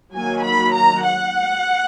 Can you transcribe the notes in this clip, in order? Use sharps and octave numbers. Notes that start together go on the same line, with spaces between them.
D#3 F#3 A#3 G#5
B5
A#5
F#5